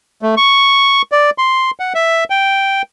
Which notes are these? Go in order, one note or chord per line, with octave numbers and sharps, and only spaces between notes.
A3
C#6
D5
C6
F#5
E5
G5